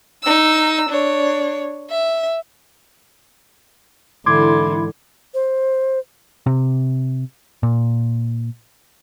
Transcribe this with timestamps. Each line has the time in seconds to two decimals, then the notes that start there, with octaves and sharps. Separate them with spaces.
0.23 D#4 E6
0.89 D4 C#5
1.90 E5
4.26 G#2 D3 E3 E4 C6 D6 G#6
5.34 C5
6.46 C3
7.63 A#2